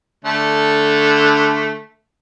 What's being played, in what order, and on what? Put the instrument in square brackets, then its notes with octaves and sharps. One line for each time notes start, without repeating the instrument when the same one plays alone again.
[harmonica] D3 A3